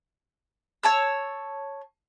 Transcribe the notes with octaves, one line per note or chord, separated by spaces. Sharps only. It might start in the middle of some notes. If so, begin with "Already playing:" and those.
C#5 A5 E6